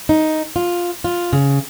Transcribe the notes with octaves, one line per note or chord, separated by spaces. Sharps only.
D#4
F4
F4
C#3